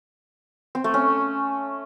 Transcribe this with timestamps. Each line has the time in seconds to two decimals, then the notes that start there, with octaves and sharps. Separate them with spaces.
0.75 C4
0.84 A3
0.94 C#4